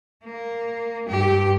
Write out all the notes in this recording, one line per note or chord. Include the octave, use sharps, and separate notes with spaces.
A#3
G2 G4